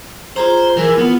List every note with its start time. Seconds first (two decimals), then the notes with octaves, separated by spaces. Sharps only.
0.36 F4 G#4 C5 A#5
0.77 E3 E4 G#4 A#4
0.98 B3 F4